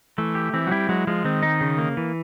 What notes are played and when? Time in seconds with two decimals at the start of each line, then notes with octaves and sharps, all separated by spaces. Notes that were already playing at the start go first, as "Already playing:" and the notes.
0.18 E3 A3
0.35 G4
0.53 E3 C4
0.67 F#3
0.71 G3 E4
0.89 F#3 G#3
1.07 F3 G#3
1.24 D#3 C4
1.42 D#4
1.61 C#3
1.78 A#3
1.97 E3